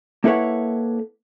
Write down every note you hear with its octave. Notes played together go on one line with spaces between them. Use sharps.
A#3 E4 A4 B4 C#5 F#5